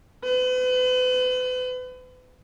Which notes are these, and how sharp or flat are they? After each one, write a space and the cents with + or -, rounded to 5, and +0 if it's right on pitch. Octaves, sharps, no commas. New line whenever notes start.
B4 +40